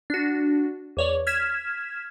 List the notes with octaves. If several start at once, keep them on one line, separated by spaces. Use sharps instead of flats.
D4 F#4
E2 C#5 D5
F6 G#6 B6 E7